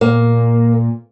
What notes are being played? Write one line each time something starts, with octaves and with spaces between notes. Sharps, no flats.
A#2 A#3